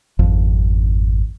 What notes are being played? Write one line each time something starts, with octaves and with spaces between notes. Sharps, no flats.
G#1 F2